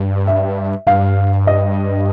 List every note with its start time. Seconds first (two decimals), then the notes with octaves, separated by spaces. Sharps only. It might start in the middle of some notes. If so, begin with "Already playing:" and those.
Already playing: G2
0.27 E5
0.87 G2 F5
1.47 D#5